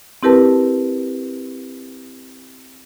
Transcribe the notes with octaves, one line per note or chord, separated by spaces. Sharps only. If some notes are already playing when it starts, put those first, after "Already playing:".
C4 E4 G4 A#4 B4 A5